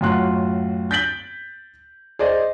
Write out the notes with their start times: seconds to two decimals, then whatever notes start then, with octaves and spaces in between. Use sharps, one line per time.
0.01 F#2 A2 F4 F#4 C6 F#6
0.91 G6 A6 B6 D7 F#7 G7
2.19 G#4 C5 D5 D#5